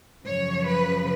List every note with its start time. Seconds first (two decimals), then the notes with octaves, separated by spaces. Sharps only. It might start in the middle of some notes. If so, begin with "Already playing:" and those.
0.24 F#2 C#3 F3 C#5
0.65 B4